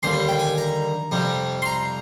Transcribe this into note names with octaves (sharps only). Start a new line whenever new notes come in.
D#2 D3 G3 C6
G5
G#5
A#5
F2 C3 G3
C6
A#5